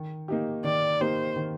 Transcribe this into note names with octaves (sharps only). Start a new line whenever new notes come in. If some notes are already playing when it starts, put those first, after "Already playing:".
Already playing: D#3
A#3 D#4 G4
D#3 D5
A#3 D#4 G4 C5
D#3